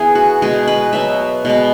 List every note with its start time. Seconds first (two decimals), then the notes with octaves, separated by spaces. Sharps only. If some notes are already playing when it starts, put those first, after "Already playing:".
Already playing: E3 B3 G#4
0.15 F#4
0.42 B2 G#3 B3 G#4
0.67 B4
0.93 B2 F#3 B3 E5
1.45 B2 G#3 B3